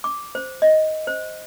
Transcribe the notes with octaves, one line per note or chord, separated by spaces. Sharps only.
D6
C5
D#5
C5